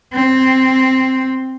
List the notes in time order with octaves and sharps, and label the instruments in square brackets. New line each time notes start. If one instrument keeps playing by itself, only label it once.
[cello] C4